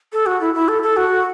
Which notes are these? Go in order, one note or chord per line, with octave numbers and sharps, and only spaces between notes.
A4
F#4
E4
E4
A4
A4
F#4